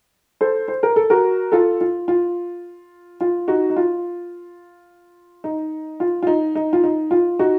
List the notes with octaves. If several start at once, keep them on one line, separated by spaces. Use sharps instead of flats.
A4 C5
C5
A#4
A4
F#4 A#4
F4 A4
F4
F4
F4
D#4 F#4
D#4
F4
D#4
F4
F4
D#4
D#4
F4
D#4
F4
D#4 F#4